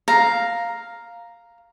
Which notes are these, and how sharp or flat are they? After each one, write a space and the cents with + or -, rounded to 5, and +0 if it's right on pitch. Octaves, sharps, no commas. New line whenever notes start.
F5 +0 A#5 +0